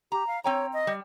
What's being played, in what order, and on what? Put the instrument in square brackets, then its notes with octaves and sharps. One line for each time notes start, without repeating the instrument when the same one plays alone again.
[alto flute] G4 [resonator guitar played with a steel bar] A#5
[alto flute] F5
[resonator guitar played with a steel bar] C4 G5 A#5 [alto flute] C#5
[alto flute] D#5
[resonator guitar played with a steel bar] G3